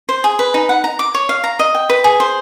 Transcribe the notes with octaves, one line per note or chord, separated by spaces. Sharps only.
C5
G#4
B4
D#4
F#5
A#5
D6
C#5
F5
A#5
D#5
G5
B4
G#4
C5